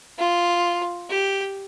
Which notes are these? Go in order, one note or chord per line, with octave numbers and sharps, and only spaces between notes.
F4
G4